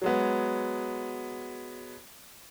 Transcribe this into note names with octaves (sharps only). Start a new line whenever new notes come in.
F#3 G#3 B3